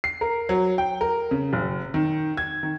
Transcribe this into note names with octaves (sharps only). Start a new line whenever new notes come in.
C7
A#4
F#3
G5
A#4
C#3
F#1
D#3
G#6
D#3